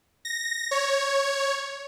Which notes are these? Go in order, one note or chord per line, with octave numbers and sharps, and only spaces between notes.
A#6
C#5